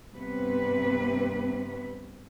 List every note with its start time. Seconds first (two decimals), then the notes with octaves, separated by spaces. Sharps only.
0.12 G2 C3 B3 C4 B4